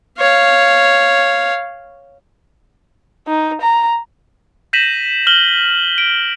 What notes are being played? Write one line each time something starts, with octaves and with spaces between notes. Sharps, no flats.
C#5 F5
D#4
A#5
G6 A#6 B6 D#7 E7 F#7
F6 F#7 G7
D7